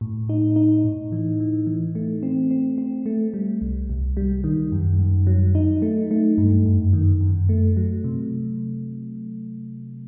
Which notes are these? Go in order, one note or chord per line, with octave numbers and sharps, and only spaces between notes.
A2
D#4
D#4
A2
E3
E3
E3
A3
C4
C4
C4
A3
G3
C2
C2
G3
D#3
F#2
F#2
F#3
D#4
A3
A3
G2
F#2
D#3
F#2
A3
F#3
C3